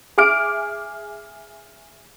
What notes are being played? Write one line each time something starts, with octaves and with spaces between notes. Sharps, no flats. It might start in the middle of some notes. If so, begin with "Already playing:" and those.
G#4 E5 D6 F6 D7